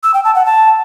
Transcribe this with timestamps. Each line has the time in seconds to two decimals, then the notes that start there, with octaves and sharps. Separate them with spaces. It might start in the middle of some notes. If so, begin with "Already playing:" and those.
0.03 E6
0.14 G5
0.24 A5
0.35 F#5
0.46 A5